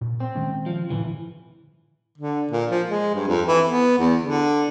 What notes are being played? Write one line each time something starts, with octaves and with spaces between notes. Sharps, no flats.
A#2
C4
D#3 G#3 C#4
F3
A2 D3 E3
D3
A#2
F3
G#3
G2
F2
E3
B3
E2
D3